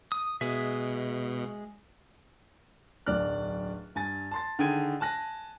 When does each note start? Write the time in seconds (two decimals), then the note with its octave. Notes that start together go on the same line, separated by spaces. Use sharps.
0.12 D#6
0.41 B2 G#3 G#4 E5
3.06 D1 B1 D5 F6 F#6
3.95 G2 G#5 A6
4.31 A5 C6 A6
4.59 D3 D#3 G#4 G5 G#6 D#7
5.00 G#5 A5 F#6 A#6